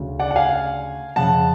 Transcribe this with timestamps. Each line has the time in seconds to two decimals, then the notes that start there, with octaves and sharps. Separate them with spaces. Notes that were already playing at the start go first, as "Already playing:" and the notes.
Already playing: D2 C#3
0.20 D5 F#5
0.31 F#5
0.36 F5 G#5
1.16 F2 C#3 F#5 A5